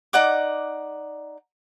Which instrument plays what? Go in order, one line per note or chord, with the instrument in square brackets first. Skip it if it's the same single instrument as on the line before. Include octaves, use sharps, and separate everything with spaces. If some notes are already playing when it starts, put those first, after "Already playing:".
[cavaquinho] D#4 D5 F#5 D6